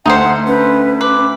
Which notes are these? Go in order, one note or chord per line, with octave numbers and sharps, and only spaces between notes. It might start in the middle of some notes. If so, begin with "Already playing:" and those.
D2 D#4 G4 C5 F#5
C#4 B4
B4 D6